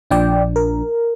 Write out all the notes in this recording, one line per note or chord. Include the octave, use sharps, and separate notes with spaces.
A#1 A#2 F3 D4 D5 G5
A#4